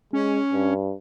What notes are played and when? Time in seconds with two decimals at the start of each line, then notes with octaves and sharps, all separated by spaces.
0.13 G#3 C#4
0.52 G2